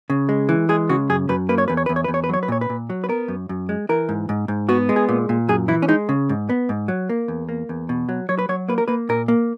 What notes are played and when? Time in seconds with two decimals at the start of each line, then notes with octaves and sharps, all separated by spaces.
0.10 C#3
0.29 G#3
0.49 E3
0.69 G#3 G#4
0.89 C#3 F#4
1.09 F#2 G#4
1.29 F#2 B4
1.49 A#3 B4
1.58 C#5
1.68 E2 B4
1.77 C#5
1.86 E2 B4
1.96 C#5
2.04 E2 B4
2.14 C#5
2.24 B4
2.29 F#3 C#5
2.43 B4
2.48 A#2 C#5
2.61 B4
2.70 A#2
2.90 F#3
3.04 B4
3.09 B3 A#4
3.28 F#2
3.49 F#2
3.69 G#3
3.89 E3 A#4
4.09 G#2
4.29 G#2
4.48 G#2
4.69 B3 F#4
4.89 G#3
4.96 G#4
5.09 A#2
5.29 A#2
5.49 F#2 G#4
5.68 E3 E4
5.82 C#4
5.88 G#3 D#4
6.09 C#3
6.29 G#2
6.49 B3
6.69 G#2
6.88 F#3
7.09 A#3
7.28 E2
7.49 A#3
7.69 E2
7.89 B2
8.09 F#3
8.29 F#3 C#5
8.39 B4
8.49 F#3 C#5
8.68 A#3 B4
8.78 A#4
8.88 A#3 B4
9.09 A#2 A#4
9.28 A#3